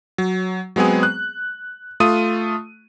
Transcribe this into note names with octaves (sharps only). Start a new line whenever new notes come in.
F#3
F#3 G#3 B3 C4 G#4
F#6
A3 F4 D#6 D#7